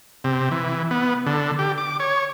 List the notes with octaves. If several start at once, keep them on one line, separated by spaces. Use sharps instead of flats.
C3
E3
B3
D3
G4
D6
C#5